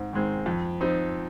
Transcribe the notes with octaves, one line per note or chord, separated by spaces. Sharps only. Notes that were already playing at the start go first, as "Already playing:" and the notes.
Already playing: G#2 C4
D#3 G#3 C4
F2
F3 C4 D#4